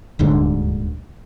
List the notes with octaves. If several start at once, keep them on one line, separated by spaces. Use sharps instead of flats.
D#1 D2 G#2 D3